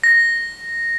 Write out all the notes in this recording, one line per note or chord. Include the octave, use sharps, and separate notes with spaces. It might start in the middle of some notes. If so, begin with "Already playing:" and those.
A#6